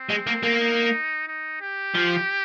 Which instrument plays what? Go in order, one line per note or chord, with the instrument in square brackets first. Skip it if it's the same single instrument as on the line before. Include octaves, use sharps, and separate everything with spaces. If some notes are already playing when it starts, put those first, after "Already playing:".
Already playing: [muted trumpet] C4
[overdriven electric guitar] G#3
A#3
A#3
[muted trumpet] D#4
D#4
G4
[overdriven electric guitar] F3